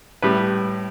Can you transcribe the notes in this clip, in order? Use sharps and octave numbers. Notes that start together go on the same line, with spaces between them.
A2 G3 B4